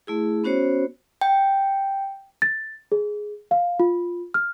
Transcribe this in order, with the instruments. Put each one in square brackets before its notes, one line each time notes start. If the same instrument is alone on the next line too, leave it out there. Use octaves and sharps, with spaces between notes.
[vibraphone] A3 E4 G#4
B3 C#4 F#4 C5 C#5
[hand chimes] G5
[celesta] A6
G#4
F5
F4
F6